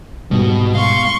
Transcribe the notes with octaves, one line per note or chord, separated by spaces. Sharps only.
G#2 B2 G3
F5 C6 C#6